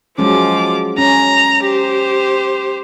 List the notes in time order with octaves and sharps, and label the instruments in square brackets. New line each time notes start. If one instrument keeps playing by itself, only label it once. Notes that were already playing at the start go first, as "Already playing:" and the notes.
[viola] F3 D6 [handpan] F#3 G#3 C#4
[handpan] C#4 [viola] A#5
[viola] G4 C5